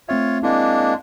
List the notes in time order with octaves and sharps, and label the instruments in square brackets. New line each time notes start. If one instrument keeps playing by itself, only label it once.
[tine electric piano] A3 C4 E5 [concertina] F4 C#5
[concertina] G#3 A#3 D4 [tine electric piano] C4 E4